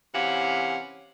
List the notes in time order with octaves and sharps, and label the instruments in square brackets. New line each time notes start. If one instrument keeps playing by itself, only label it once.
[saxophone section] C3 E3 C#4 G4 F5 F#5